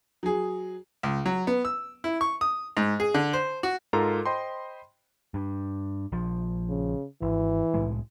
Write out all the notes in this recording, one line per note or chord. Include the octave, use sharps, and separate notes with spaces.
F#3 G#4
C#2
F#3
B3
E6
E4
C#6
D#6
G#2
G#4
D3
C5
F#4
G#2 F4 A4 A#4 A#5
C5 D#5 G5 B5 C6
G2
A#1 F3
C#3
G#1 E3
C2 A2 G#3